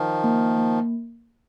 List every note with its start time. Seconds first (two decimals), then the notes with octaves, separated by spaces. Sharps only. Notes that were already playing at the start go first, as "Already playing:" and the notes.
Already playing: D#3 F3
0.24 A#3
0.58 A#3